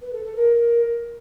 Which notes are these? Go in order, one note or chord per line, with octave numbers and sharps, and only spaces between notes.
B4
A4
A4
A#4